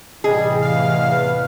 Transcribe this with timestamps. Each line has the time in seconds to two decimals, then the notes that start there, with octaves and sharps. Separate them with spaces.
0.24 A2 C3 E3 G3 G#4 D#5
0.61 E2 F5
1.10 B4